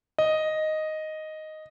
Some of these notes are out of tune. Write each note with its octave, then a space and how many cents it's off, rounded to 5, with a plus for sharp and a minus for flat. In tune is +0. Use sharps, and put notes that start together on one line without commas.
D#5 +0